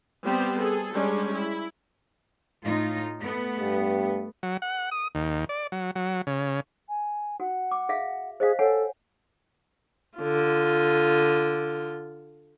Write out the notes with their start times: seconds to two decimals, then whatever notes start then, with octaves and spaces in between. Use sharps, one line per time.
0.24 G3 B3 C4 G4 C5
0.59 G#4 A4
0.93 G3 G#3 C#4 D4
1.33 E4
2.63 A2 D#4 F4
3.19 A3 B3
3.59 G2
4.43 F#3
4.62 F#5
4.91 D#6
5.15 D#2
5.49 D5
5.72 F#3
5.96 F#3
6.27 C#3
6.89 G#5
7.40 F#4 F#5
7.71 D6
7.89 G#4 E5 F5
8.40 G#4 C5 D#5 F5
8.59 A4 C#5 F#5 G#5
10.18 D3 F4